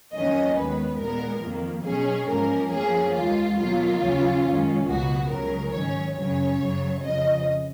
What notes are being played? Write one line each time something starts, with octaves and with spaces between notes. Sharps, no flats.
F2 D#3 F#3 A#3 C#4 D#5
D#2 D#3 G#3 B3 B4
A#2 G#3 B3 A#4
F2 D#3 A#3
B2 F#3 C#4 G#4
G#2 F3 A#3 C#4 A#4
F#2 F3 A#3 C#4 G#4
D#2 D#3 G#3 F4
B2 F#3 A#3 F4
D#2 C#3 F#3 C#4
F#2 D#3 G#3 C#4
C#2 B2 F#3 B3 F#4
C#2 C#3 F#3 A#4
G#2 D#3 F#3 C#4 C#5
F#2 C#3 F#3 C#4 C#5
F#2 C#3 F#3
F2 C#3 F3 D#5